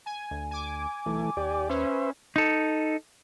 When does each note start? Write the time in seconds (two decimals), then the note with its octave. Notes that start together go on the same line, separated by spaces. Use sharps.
0.06 G#5
0.31 D2
0.51 G#5 D6
1.06 B1 E3 A3
1.37 D#2 G4 D5
1.69 C#4 B4 C5 E5
2.36 D#4 A4